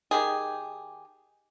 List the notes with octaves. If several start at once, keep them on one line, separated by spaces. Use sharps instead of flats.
D#3 G4 G#4